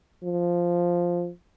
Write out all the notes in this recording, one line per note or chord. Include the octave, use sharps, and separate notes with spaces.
F3